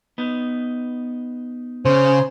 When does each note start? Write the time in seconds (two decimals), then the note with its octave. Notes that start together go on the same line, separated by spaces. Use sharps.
0.18 B3 D#4
1.85 C#3 C5